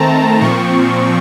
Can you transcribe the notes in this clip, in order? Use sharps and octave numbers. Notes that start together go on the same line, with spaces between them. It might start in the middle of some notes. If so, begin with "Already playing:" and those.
Already playing: D#3 A3 C4 A5 A#5
A#2 F3 C4 C#6